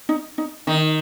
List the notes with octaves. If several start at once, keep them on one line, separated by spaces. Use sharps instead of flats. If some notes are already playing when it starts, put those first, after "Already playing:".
D#4
D#4
D#3 D#4